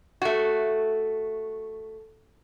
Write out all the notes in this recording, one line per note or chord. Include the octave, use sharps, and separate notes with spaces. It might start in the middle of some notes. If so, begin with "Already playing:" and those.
A3 F#4